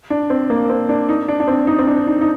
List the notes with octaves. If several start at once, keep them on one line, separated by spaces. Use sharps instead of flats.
D4
C4
A#3
C4
D4
D#4
D4
D4
C4
D#4
C4
D4
D#4
D#4